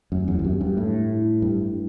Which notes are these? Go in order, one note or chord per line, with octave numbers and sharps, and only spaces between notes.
F#2 A3
E2
E2
F#2 G4
G2
A2 A3
E4
G2 A3